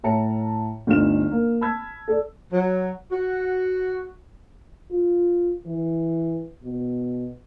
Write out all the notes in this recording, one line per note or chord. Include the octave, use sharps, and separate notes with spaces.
A2 C#5 E5 A5 A#5 C#7
G1 D2 D#4 F4 F6 E7
A#3
A5 B5 E6 G#6
A4 D5
F#3
F#4
F4
E3
B2